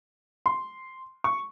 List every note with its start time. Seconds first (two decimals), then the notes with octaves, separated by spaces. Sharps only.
0.46 C6
1.24 C#6